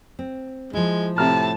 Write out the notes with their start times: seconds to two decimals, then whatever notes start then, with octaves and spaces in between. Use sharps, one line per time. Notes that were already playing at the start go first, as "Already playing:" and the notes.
0.19 C4
0.73 F3 G#3 E4
1.18 A2 C3 A5 A#5 F6